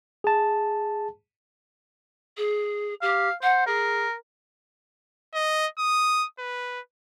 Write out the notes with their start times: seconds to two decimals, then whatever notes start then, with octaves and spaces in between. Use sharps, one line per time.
0.24 G#4 A5
2.37 G#4
3.02 G4 F5
3.42 C5 F#5
3.67 G#4 A#4
5.34 D#5
5.79 D#6
6.39 B4